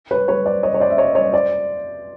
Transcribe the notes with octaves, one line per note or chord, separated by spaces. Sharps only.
B4 C#5
B4 C#5
C5 D5
C#5 D#5
C#5
C5 D5
E5
C#5 D#5
C#5 D#5
C5 D5